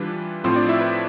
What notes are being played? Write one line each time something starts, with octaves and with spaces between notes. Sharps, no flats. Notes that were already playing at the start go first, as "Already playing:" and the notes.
Already playing: E3 G3 D4 F4 B4
A2 F3 C4 F4 C5
D4 D5
E4 E5
B4